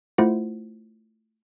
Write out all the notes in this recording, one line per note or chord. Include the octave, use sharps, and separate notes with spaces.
A3 E4 F4 C5 F#5